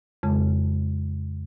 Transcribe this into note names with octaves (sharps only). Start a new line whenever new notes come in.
F2 C#3 G#3